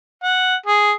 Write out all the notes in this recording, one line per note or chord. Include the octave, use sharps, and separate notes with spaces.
F#5
G#4